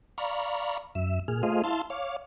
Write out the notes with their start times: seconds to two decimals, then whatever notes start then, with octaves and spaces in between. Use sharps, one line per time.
0.18 D5 F5 A#5 B5 C#6
0.95 F#2 E5
1.28 A#2 G#4 F6
1.43 A3 F4 G#4 C5 D#5 F5
1.64 E4 F5 A5 C6
1.90 C#5 F5 D6